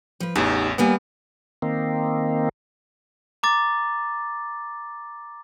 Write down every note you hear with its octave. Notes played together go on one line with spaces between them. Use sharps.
F3 B4
A1 E2 D#4 G4
D#2 G3 A#3 B3 G#5
D#3 A#3 C4
A#5 D6 A6